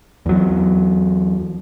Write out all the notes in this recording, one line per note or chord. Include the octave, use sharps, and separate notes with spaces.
E2 F#3